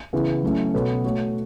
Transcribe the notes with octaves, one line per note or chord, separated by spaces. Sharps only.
C#3 E3 B3 E4 B4
F#3 A3 C#4 E4
B2 B3 F#4 A4 C#5
A3 F#4 C#5